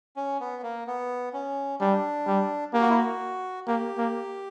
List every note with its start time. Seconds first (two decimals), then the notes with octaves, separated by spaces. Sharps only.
0.17 C#4
0.40 B3
0.63 A#3
0.87 B3
1.33 C#4
1.80 G3 D4
2.26 G3
2.74 A#3 G4
2.81 F#4
2.89 E4
2.97 F#4
3.67 A#3 G4
3.98 A#3